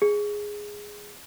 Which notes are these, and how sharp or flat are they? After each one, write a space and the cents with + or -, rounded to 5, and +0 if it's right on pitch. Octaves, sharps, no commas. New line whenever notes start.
G#4 -5